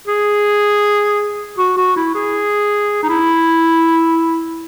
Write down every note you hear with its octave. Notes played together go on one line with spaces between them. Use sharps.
G#4
F#4
F#4
E4
G#4
D#4
E4